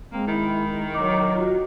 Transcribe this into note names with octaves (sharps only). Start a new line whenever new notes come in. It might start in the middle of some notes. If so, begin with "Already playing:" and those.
G#3 A#3 C4
D#3 E4
F#3 D#5 D6
F4 F#4